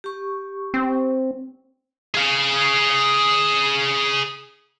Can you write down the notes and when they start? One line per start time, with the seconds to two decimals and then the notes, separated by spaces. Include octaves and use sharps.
0.04 G4 C#6
0.74 C4
2.15 G#4 F5